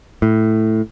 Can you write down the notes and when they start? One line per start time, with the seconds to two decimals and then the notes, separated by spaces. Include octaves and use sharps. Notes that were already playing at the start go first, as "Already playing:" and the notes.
0.22 A2